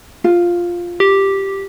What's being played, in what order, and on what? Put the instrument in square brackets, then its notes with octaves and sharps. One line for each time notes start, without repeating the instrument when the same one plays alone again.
[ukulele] F4
[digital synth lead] G4